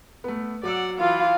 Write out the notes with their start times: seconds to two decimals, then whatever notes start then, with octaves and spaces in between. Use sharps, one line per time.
0.24 A3 B3
0.63 F#3 D5 F#5 D6 E6
0.99 E3 F4 F5